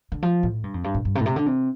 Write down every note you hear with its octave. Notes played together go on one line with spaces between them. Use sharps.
D3
F3
A2
G2
F2
G2
A2
G2
C3
A2
C3
D3
C3